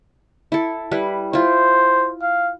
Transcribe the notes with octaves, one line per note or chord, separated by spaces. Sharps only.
E4 A4
G3 E4 B4
E4 F4 C5
F5